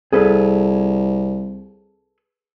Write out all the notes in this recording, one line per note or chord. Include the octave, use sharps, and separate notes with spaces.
C2 G#4 A4 B4